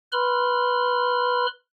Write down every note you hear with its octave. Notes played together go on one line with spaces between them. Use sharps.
B4 B5 C6 F6